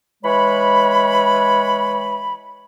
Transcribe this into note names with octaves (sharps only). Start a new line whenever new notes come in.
E3 G#3 C#5 B5